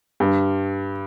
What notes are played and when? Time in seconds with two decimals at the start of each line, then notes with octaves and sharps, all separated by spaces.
0.20 G2